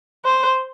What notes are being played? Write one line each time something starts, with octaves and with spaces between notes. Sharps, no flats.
C5